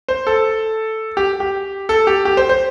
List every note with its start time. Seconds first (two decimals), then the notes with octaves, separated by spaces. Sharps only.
0.08 C5
0.27 A4
1.17 G4
1.40 G4
1.89 A4
2.07 G4
2.25 G4
2.37 C5
2.49 C5